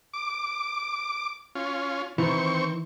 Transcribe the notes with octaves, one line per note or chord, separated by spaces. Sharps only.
D6
C#4 F4
D#3 E3 C4 C#6